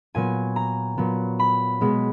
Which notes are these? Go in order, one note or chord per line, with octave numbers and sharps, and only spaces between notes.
A#2 F#3 B3 G#5
A#5
A#2 F#3 B3
B5
B2 G#3 B3